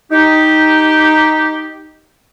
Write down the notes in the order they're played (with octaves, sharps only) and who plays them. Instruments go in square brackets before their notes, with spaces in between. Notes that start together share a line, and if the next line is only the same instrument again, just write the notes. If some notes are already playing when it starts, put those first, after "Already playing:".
[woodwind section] D#4 G4